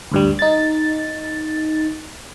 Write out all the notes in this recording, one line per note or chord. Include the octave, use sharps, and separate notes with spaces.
D2 G2 G3
D#4 A6